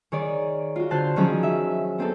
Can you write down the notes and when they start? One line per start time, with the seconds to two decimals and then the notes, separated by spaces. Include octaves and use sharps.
0.12 D#3 G#4 C#5 D5
0.76 F4 F#4
0.91 D3 C5 A5 C6 F#6
1.16 D#3 F3 F#3 C#4 G#4
1.43 E5
1.98 B3 C4 D#4 A4